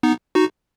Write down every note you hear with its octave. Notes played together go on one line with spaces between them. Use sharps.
B3 D#4
D#4 F#4